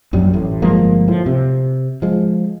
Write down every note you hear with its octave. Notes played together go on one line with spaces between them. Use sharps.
A#1 F#2 F#3 G3
A1 A2
G1 F3 G#3 A#3
A2 F3
C3
F3 G#3